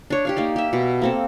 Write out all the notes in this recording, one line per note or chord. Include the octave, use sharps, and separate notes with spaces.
D4 C#5
G4 C#5 F5
A#3 D#4 D5
G4 E5
B2
A#3 C4 A4